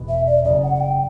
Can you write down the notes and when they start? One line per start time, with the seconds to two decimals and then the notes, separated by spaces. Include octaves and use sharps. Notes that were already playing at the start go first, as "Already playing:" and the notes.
Already playing: E1 E2 B2
0.09 E5
0.27 D5
0.45 F#1 F#2 C#3 D5
0.63 F#5
0.75 F#5
0.80 G5